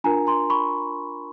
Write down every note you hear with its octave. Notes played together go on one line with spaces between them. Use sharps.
D4 F4 A#4 G#5 A#5
A#5 C6
B5 C#6